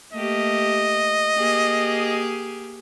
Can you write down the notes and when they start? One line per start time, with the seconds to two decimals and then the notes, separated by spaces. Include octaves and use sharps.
0.13 A3 A#3 G4 D#5
1.38 A#3 G4 G#4